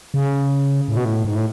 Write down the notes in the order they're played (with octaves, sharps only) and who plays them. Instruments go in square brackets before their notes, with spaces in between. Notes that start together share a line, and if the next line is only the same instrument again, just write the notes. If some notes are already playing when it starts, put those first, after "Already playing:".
[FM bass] C#3
A2
B2
A2
G#2
A2